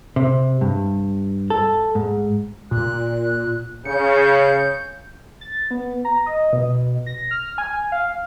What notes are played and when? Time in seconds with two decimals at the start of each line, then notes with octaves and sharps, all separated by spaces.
0.16 C3
0.61 G2
1.50 A4
1.95 G#2
2.71 A#2 F#6
3.85 C#3 G6 C#7
5.41 A6
5.71 B3
6.05 A#5
6.26 D#5
6.53 B2
7.06 A#6
7.31 F6
7.58 G#5
7.92 F5